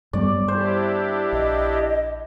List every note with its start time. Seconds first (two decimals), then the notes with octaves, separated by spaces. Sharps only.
0.13 G2 G3 B3 D5
0.48 D4 E4 G4 C5
1.32 A#1 D#5